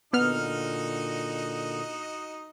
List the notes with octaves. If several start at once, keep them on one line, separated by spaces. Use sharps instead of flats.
A#2 D3 B3 D#4 F#4 D#5 F6